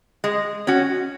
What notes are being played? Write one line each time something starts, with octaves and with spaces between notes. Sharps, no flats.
G#3
C#4 F#4